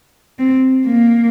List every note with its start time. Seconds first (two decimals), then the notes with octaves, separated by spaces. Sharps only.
0.39 C4
0.86 A#3